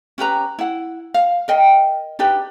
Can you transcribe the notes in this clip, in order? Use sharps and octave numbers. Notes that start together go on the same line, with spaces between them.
C#4 G4 B4 A#5
E4 F#5
F5
A#4 D#5 G5
D4 D#4 G4 B4